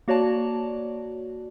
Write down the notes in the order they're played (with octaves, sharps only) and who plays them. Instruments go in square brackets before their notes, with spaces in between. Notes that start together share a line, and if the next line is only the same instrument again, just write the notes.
[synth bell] A#3 F#4 C#5 D5 A5